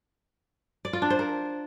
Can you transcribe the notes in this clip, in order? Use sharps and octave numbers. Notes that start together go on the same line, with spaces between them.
D5
F4
D4
C5
A#4